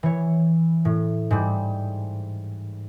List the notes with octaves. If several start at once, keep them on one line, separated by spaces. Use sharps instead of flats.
E3 C#5
A2
G#2 G3